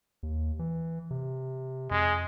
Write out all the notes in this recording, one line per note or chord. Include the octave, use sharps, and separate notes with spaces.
D#2
E3
C3
F2 G#3